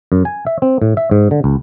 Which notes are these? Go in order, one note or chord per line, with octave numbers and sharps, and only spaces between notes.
F#2
G#5
E5
C4
A2
E5
G#2
D3
C#2